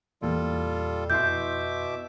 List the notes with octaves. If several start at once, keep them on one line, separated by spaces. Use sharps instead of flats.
E2 A#2 E3 G3 F4 A4
F2 B2 E4 E5 C6 D6 G6